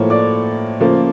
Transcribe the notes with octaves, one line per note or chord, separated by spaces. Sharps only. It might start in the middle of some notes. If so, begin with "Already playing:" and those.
Already playing: A2 F3 A#3 C#5
D5 D6
C#3 F3 A#3